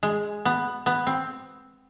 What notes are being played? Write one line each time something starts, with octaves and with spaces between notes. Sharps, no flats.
G#3
B3
B3
C4